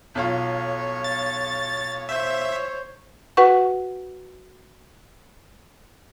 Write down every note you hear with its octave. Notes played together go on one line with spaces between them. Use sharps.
B1 F4 C#5
A6
C5 C#5 E5
F#4 B4 F#5 C#6